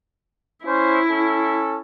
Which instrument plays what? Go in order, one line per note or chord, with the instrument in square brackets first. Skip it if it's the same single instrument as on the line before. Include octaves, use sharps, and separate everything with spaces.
[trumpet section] C#4 C5 [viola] E4
[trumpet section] C#4 A4